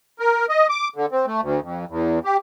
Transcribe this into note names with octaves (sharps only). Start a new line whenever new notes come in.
A#4
D#5
D6
D3
C4
A3
D2
F2
E2
G4